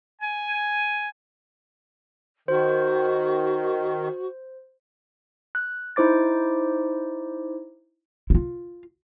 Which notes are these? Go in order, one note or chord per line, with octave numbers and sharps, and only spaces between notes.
G#5
D#3 F#4 C5
F#6
D#4 E4 C5 D6 A6
E4 F4